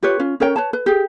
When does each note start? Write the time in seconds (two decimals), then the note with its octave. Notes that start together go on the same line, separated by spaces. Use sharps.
0.03 F4 G4 B4 C#5
0.20 C#4 F4
0.40 C#4 A#4 C#5 G5
0.56 B4 C#5 A5
0.73 B4
0.86 G4 G#4